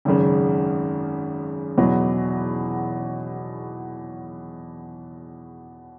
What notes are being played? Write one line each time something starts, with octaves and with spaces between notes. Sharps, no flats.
G#1 F#2 C#3
E2 B2 F#3